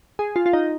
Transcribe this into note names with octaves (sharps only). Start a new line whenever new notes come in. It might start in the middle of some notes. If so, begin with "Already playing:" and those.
G#4
F4
F4
D#4